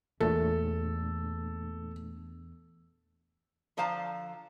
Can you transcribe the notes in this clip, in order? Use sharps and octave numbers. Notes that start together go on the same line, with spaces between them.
E2 A#2 A3 D4 A4
D3 F3 C5 F5 A5 A#5